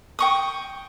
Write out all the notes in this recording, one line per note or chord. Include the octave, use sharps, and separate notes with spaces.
G5 C#6 D#6